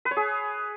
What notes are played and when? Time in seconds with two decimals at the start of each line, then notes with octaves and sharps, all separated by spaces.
0.05 B4
0.11 C#5
0.17 G#4